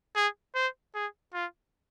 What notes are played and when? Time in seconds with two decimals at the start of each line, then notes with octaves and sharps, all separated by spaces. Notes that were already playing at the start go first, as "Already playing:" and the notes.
0.16 G#4
0.55 C5
0.95 G#4
1.34 F4